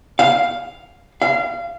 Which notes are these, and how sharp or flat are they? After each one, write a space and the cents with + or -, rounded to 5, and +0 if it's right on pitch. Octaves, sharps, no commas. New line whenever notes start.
F5 +0
F5 -25